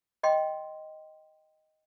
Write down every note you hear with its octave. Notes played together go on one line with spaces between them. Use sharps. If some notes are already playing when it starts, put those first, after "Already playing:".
D#5 G5 C6